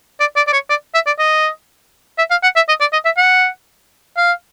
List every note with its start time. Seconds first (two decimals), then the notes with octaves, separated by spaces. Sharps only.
0.20 D5
0.36 D5
0.47 D5
0.53 C#5
0.69 D5
0.94 E5
1.06 D5
1.19 D#5
2.18 E5
2.31 F5
2.43 F#5
2.56 E5
2.68 D#5
2.80 D5
2.93 D#5
3.05 E5
3.17 F#5
4.17 F5